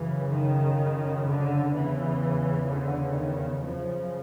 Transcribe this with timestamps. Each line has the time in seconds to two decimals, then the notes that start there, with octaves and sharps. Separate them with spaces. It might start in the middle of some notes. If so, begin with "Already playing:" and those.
Already playing: F#2 C#3 E3
0.30 D#3
1.25 D3
1.72 E2 C#3 E3
2.67 D3
3.14 D#3
3.61 F#2 C#3 F3